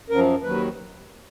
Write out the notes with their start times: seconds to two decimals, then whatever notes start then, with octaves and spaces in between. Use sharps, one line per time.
0.09 F#2 F3 A#4
0.42 D#2 D#3 F#3 B4